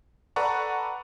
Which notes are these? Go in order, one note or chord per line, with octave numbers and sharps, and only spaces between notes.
A4 B4 D5 F#5 A#5 C#6